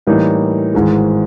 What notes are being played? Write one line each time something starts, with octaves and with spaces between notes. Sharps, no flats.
A2 E3 G3 A#3 D#4
G#1 G#2 E3 G#3